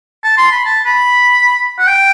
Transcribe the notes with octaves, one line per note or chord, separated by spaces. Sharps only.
A5
C6
B5
A5
B5
F#5
G5